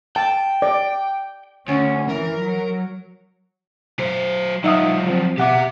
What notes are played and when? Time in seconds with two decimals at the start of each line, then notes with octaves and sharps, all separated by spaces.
0.16 G5 A5
0.62 D5
1.68 D2 C#4
2.10 E3 A#4
2.39 F#3
4.00 F#3 C5
4.64 F#3 D#4 F4 E5 D#6
5.07 F3 C4
5.38 B2 G4 E5 F#5 D6